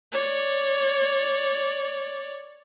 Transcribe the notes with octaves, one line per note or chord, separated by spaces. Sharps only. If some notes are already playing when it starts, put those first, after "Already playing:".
C#5 D5